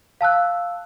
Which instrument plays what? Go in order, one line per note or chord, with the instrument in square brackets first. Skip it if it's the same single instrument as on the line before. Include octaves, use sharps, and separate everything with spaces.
[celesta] F5 A5 E6 F#6